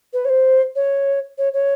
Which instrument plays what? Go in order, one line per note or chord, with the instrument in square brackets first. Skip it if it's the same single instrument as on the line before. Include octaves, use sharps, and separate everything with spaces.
[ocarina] B4
C#5
C5
C#5
C#5
C#5